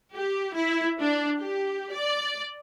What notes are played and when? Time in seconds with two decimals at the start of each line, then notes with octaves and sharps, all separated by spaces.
0.16 G4
0.56 E4
1.00 D4
1.38 G4
1.93 D5